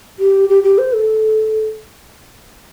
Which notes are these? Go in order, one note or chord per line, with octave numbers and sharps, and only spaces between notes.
G4
G4
G4
C5
A4